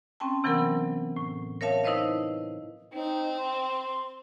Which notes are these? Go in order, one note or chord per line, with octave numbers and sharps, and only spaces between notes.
C4 C#4 G5 A5
C3 E3 F#3 B3 C4 A#4
A2
A#4 C#5 E5 F5 A5
D#4 E4 B4 C5 D#5 F5
C4 D#4
C6